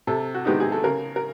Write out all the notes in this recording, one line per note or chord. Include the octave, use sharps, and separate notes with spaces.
C3 A4
F#4
D#3 G#3 B3 D#4 G4
G#4
A4
C#3 A#4
A#4